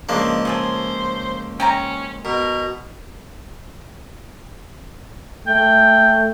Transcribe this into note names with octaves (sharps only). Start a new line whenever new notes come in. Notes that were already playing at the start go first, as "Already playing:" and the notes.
C#2 F3 A#3 D4 D#5
C#3 G#4 A4 C5
C#4 G5 G#5 A#5
B2 A#4
A3 G5